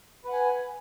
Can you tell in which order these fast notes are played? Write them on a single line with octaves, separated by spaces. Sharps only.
B4 F#5 G#5